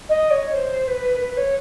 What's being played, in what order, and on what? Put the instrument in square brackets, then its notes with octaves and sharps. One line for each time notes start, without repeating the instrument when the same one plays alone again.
[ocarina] D#5
C#5
C5
B4
B4
C#5